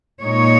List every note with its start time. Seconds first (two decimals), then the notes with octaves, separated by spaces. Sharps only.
0.21 A#2 G#3 D#4 C#5